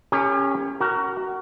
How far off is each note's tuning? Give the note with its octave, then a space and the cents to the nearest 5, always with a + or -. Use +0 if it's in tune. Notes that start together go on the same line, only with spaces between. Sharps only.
C#4 +0 G4 +40 A#4 -35
F#4 +20 A#4 -10